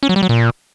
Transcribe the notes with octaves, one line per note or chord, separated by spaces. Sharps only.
C#4
F#3
G3
F#3
A#2